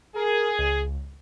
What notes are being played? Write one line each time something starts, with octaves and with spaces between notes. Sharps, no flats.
G#4 A#4
C#2